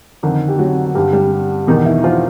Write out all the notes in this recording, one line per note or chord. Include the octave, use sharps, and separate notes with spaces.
F2 D3 D#3 D#4
G4
F#3 F#4
G2 D3 G3 G4
G3 G4
E2 B2 D#3 D#4
E3 E4
F3 F4